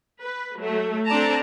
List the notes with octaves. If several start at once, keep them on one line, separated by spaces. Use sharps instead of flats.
B4
F#3 A3
C4 D4 A4 D5 A5 A#5